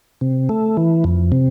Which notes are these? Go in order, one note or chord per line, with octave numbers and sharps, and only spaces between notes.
C3
A3
E3
F2
C3